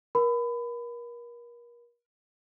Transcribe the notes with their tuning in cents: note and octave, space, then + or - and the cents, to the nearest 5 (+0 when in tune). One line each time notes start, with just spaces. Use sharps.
A#4 +35 B5 +25